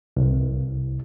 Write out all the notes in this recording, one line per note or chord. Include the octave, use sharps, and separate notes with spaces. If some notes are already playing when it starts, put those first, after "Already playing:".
C2